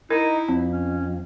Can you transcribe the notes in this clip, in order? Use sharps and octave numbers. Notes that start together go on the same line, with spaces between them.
D#4 E4 A#4
F2 C4
C#4